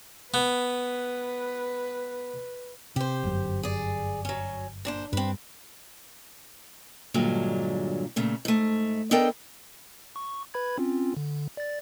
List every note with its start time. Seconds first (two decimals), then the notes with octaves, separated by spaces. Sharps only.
0.34 B3 B4
2.96 C3 G4 C5
3.23 G1 F#2
3.63 G#4 D5
4.25 F#3 C#4
4.85 A#2 D4 C5
5.13 G2 C4 B4
7.14 G2 A#2 D3 F#3 G#3
8.16 A#2 C#3 A3
8.45 G#2 A3
9.11 B3 D4 A4 A#4 D#5 G5
10.16 C#6
10.54 B4 B5 G#6
10.78 C4 C#4 F4
11.17 D3
11.57 D5 A6